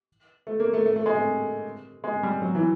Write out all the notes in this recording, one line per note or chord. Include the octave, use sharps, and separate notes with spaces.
A3
A#3
A3
A3
A3
G#3
A3
G#3
G3
F#3
E3